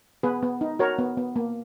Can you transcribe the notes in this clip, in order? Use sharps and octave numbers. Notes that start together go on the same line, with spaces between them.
B3 G#4 B4
B3
D#4
F#4 A#4 C#5
B3
B3
A#3